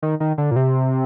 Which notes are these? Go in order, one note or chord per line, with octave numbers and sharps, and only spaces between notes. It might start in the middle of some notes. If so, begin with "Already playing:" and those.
D#3
D#3
D3
A#2
C3